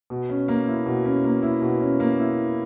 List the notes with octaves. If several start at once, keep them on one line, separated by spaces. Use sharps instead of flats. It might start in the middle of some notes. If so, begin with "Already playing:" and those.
B2
C#4
A#3
E4
B2
C#4
A#3
E4
B2
C#4
A#3
E4